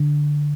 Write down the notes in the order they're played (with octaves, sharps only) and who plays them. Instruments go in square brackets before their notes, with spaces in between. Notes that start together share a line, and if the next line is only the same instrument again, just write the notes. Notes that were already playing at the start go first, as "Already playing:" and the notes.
Already playing: [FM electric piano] D3